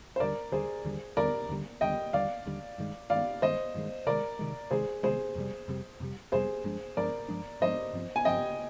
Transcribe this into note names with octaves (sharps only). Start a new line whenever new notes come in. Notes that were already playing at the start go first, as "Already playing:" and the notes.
C5
D#2 D3 G3 A#4 D5
D#2 D3 G3 G#4 C5
D#2 D3 G3
D#2 D3 G3 A#4 D5
D#2 D3 G3
D#2 D3 G3 D#5 G5
D#2 D3 G3 D5 F5
D#2 D3 G3
G2 D#3 G#3
G2 D#3 G#3 D5 F5
G2 D#3 G#3 C5 D#5
G2 D#3 G#3
C3 D#3 G#3 A#4 D5
C3 D#3 G#3
C3 D#3 G#3 G#4 C5
C3 D#3 G#3 G#4 C5
F2 C3 G3
F2 C3 G3
F2 C3 G3
F2 C3 G3 G#4 C5
G2 F3 G#3 D4
G2 F3 G#3 D4 A#4 D5
G2 F3 G#3 D4
G2 F3 G#3 D4 C5 D#5
G2 F3 C4
G#5
G2 F3 C4 D#5 G5